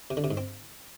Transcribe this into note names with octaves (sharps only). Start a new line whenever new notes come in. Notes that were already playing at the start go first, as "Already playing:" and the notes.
C3
D3
C3
G#2
C4